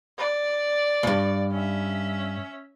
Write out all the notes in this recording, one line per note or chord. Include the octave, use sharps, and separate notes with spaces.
D5
C#2 G2
C#4 E5